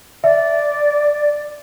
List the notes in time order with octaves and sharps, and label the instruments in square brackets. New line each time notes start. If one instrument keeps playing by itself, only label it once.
[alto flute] D5 [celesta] E5